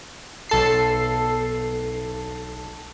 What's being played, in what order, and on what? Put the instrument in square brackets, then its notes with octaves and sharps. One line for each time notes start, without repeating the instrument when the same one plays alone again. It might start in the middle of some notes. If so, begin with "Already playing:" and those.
[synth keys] B1 A4 C7